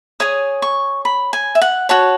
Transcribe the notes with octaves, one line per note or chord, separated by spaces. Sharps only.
G#4 C#5 D#6
C#6
B5
G#5
E5
F#5
F#4 C#5 A5